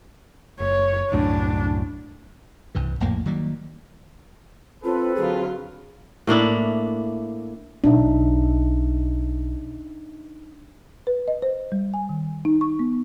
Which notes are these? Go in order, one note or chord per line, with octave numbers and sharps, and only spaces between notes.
F#1 C#5
C2 F#2 A2 D4
C2 G2 E3
A#1 F2 A2 A#3
D#3 F#3 G3 A#3
C4 F4 A4 B4
D3 F#3 F4 G#4
A2 A#3 D4 E4
B1 D4 D#4 E5
B4
D#5
C5
G3
G#5
D#3
D#4
C#6
B3